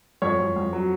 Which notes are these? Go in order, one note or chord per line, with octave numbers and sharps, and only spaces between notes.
F2 C#5
F2
F2
F#3